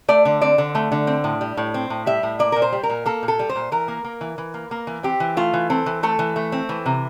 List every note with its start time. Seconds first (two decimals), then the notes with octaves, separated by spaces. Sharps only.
0.08 A3 D5
0.25 D3
0.42 C4 D5
0.58 D3
0.75 A3
0.92 D3
1.07 C4
1.24 A2
1.41 G3
1.57 A2
1.74 C4
1.90 A2
2.06 G3 E5
2.23 A2
2.39 A#3 D5
2.52 A#2 A#4
2.62 C5
2.72 G3
2.83 A#4
2.90 A#2
3.06 A#3 A4
3.23 A#2
3.28 A4
3.39 G3
3.49 C5
3.56 A#2
3.72 E3 A#4
3.88 A#3
4.04 A#3
4.21 E3
4.38 E3
4.54 A#3
4.71 A#3
4.87 E3
5.03 C4 G4
5.20 E3
5.37 A3 F4
5.54 E3
5.70 C4 A4
5.86 E3
6.03 A3 A4
6.19 E3
6.36 A3
6.52 C4
6.69 E3
6.86 C3